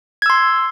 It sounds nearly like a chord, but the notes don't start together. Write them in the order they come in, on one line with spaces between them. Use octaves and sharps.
G#6 E6 C6